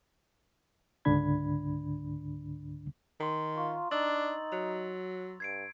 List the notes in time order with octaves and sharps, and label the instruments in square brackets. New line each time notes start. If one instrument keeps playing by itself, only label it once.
[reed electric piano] C#2 G#2 D3 D4 B5 G#6
[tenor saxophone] D#3 [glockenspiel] A#5 C6
[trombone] F4 [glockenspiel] C#6
[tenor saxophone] D4 [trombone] D#4 [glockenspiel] E6 A6 F#7
[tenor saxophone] F#3 [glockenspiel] F7
[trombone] G2 [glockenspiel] G#6 C7 D7